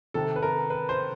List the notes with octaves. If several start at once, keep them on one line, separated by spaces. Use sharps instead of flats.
C3 D#3 A4
B4
A#4
B4
C5